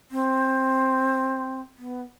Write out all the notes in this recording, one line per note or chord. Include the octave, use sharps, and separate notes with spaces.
C4
B3